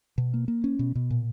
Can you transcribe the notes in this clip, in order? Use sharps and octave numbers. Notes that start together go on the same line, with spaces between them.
B2
A#3
A#3
C#4
B2
B2
A#2